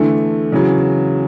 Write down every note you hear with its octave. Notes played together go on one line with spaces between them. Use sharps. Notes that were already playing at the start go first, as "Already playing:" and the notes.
Already playing: E2 D3 A3
E2 C#3 F#3